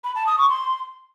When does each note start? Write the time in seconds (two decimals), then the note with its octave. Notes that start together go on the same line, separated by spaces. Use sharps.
0.04 B5
0.15 A5
0.27 D#6
0.38 C#6
0.49 C6